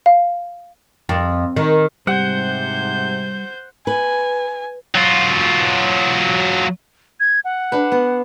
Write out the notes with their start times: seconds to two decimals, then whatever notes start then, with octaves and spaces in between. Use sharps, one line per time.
0.06 F5
1.09 F2
1.56 D#3
2.07 G#2 C3 G3 C5 F#5 G6
3.87 B4 G#5
4.95 F#3 F4
7.20 G#6
7.45 F#5
7.72 D4 B4
7.92 B3